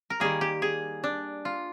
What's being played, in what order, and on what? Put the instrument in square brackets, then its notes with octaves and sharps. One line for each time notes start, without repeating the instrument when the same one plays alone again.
[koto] A#4
D#3 G3 A#3 G#4
G4
G#4
D4
F4